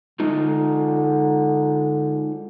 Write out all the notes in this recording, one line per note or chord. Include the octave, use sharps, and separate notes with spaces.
D3 G#3 D#4 F4